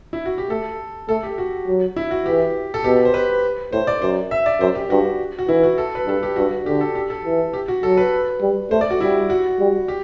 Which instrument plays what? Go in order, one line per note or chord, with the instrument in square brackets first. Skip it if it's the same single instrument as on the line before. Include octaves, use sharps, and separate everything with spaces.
[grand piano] E4
F#4
G4
[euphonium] A3 [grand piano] A4
[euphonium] A3 [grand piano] A4
[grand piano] G4
F#4
[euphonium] F#3
[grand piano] E4
F#4
[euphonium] E3 [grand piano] G4
[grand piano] A4
[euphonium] B2 [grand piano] G4
[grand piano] C5
B4
[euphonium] A2 [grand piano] C5
[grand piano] D5
[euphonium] F#2 [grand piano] C5
[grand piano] E5
D5
[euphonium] F#2 [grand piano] C5
[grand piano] G4
[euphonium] G2 [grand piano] F#4
[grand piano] F#4
[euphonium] E3 [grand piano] E4
[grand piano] F#4
A4
B4
[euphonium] G2 [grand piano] A4
[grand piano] G4
[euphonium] G2 [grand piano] F#4
[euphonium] D3 [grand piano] G4
[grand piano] A4
G4
A4
[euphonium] E3
[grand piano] G4
F#4
[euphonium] F#3 [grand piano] A4
[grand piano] B4
[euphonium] G3
[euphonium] A3 [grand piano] C5
[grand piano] D5
F#4
[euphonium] G3 [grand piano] E4
[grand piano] F#4
[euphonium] G3
[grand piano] G4